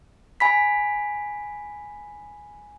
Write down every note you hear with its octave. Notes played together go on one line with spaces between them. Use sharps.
G#5 B5 B6